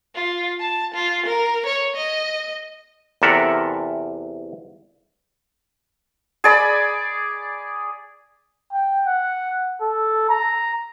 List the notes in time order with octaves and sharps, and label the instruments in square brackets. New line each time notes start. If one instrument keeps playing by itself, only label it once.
[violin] F4
A5
F4
A#4
C#5
D#5
[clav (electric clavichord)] E2 C3 A4 A#4 E5 F#5
[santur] G#4 D5 B5
[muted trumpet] G5
F#5
A4
A#5